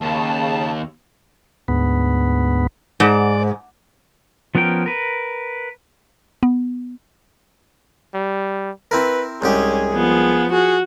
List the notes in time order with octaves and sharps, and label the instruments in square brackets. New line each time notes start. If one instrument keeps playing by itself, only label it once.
[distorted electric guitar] D#2 [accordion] C#3 A5
[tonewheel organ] D2 G#2 B3
[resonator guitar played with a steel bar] G#2 [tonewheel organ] D5
[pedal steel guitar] F3 B3 C#4 A#4 G5
A#4 B4
[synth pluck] B3
[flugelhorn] G3
[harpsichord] C4 E4 A#4 [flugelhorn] B4
[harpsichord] C2 G#2 G4 [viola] C#4 [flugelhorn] G#4
[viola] F3 B3
[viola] F#4 [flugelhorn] G#4